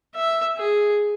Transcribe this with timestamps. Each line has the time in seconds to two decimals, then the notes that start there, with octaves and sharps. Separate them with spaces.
0.15 E5
0.58 G#4